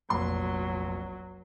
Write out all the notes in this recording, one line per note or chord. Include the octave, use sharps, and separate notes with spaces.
F1 A#1 F#3 C6